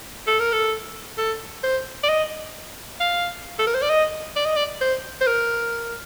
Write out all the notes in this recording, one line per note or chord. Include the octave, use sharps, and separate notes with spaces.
A4
A#4
A4
A4
C5
D5
D#5
F5
A4
A#4
C5
D5
D#5
D5
D#5
D5
C5
C5
A#4